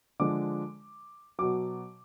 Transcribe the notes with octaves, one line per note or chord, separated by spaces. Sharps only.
D3 F3 G#3 D6
B2 F#3 D6